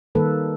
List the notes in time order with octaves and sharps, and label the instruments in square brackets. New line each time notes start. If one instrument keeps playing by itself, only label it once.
[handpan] D#3 G3 A#3 A4 B4